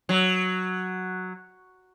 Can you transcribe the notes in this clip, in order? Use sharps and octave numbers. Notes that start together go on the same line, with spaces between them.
F#3